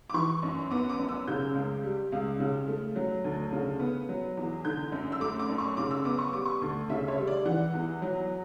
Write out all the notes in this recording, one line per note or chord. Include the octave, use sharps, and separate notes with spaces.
D6
E3 C#6
F#2
B3 D6
D6
F#2
E6
C#3 G6
C#2
G3
C#2
C#3
A3
F#3
D2
C#3
B3
F#3
E2
D3 G6
F#2
E6
A3 D6
D6
F#2
C#6
C#3 D6
E6
B3 D6
C#6
G3 D6
C#6
D2
C#3 E5
C#5
G3
D5
E3 F#5
E2
F#3